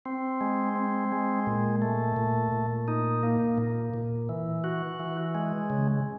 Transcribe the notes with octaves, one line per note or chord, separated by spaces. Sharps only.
C4
G#3
C4
G#3
A#2
A3
A#2
A#2
D#4
A#3
A#2
A#2
E3
F#4
E3
G#3
C#3